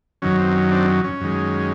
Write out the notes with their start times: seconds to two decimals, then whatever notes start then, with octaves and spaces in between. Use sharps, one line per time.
0.22 F#2 D#3 F#3 C#4
0.39 C4
0.55 C#4
0.71 C4 D4
0.88 C#4
1.04 C#4
1.21 F#2 D#3 G#3